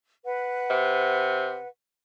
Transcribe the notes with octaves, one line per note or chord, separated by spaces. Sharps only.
B4 F#5
C3